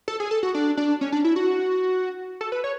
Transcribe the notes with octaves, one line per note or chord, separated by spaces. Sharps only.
A4
G#4
A4
F#4
D4
D4
C#4
D4
E4
F#4
A4
B4
C#5